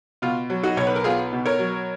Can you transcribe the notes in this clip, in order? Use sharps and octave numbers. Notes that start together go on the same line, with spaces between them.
B2 F4
F#3
D#4 F#4
B1 C#5
B4
A#4
B3 F4 G#4
B2
A#4 C#5
F#3